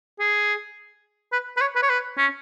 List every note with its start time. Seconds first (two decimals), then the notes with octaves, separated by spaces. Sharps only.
0.19 G#4
1.32 B4
1.57 B4
1.61 C#5
1.76 B4
1.82 C#5
1.89 B4
2.17 C#4